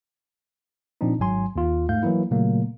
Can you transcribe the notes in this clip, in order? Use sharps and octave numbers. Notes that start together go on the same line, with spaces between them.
A#2 F3 C4 D4 D#4
G#1 G#2 F#3 G#5 C6
D#2 F4
G#2 A3 F5 G6
E3 F#3 A#3 E4
A#2 C#3 F#3 A3 A#3